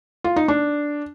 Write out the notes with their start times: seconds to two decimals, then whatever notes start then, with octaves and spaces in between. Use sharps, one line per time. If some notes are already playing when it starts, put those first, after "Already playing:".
0.24 F4
0.36 D#4
0.48 D4